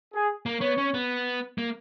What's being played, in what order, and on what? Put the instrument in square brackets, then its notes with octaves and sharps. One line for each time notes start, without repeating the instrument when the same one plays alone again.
[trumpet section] G#4
[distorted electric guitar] A#3
[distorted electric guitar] B3 [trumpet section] C#5
[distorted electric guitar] C#4
B3
A#3